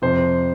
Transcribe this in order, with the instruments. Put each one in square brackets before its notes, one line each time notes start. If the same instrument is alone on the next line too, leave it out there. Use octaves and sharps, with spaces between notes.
[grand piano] F2 C3 F3 C5